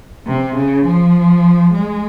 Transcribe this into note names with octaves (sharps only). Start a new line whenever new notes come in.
C3
C#3
F3
G#3